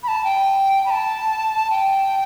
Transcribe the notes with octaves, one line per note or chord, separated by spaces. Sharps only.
B5
A5
G5
B5
A5
G5